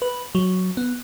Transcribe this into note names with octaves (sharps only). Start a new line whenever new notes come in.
B4
F#3
B3